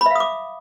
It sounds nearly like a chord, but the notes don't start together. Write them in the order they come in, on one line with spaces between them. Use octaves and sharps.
B5 E5 F5 D#6 D6